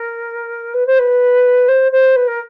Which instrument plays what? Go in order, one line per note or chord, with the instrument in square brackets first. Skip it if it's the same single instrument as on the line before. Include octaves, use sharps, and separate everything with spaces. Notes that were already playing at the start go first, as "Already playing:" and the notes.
Already playing: [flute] A#4
B4
C5
B4
C5
C5
B4
A#4